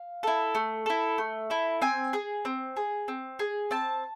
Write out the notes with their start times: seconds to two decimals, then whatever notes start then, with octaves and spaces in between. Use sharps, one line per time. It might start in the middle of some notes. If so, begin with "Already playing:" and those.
Already playing: F5
0.23 E4 A4
0.55 A3
0.86 E4 A4
1.18 A3
1.50 E4 A4
1.82 C4 G#5
2.13 G#4
2.45 C4
2.77 G#4
3.08 C4
3.39 G#4
3.71 C4 A5